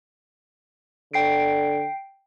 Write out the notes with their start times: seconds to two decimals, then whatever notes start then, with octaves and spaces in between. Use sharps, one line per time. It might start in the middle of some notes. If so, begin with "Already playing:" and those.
1.14 D3 G5 C7 D7